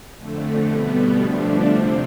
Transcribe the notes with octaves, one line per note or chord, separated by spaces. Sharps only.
F2 D3 A3
B2 G3 B3
D3 F3 A3 D4
C3 F3 C4